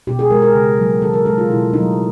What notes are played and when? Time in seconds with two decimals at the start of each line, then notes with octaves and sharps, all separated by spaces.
0.07 B2 G4
0.19 G#4
0.30 G#3 A#4
0.42 A#4
0.54 C#3
0.78 F#3 A#3
1.02 D#3 A4
1.13 A#4
1.25 G#3 A4
1.38 F4
1.50 B2 E4
1.73 F#3 A3 D#4